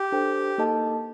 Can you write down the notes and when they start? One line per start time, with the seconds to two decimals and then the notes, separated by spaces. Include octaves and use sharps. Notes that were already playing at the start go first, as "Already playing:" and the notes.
Already playing: G4
0.12 D4 A4 C5 G5
0.58 A#3 D#4 A4 D#5 A5